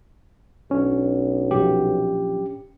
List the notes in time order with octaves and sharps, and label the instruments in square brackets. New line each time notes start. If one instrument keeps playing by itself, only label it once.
[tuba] B1 [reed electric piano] C#4 D4
[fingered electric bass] A#2 F3 F#3 [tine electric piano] G4